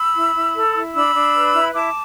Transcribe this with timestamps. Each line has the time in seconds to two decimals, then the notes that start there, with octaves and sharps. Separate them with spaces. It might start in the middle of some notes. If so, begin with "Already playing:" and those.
Already playing: B5 E6
0.14 E4
0.34 E4
0.54 A4
0.74 E4
0.94 D4 B5 E6
1.15 D4
1.34 B4
1.54 E4
1.74 E4 A5 D6